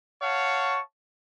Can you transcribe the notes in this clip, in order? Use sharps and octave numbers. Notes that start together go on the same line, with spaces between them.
C#5 F5 F#5 A5 C#6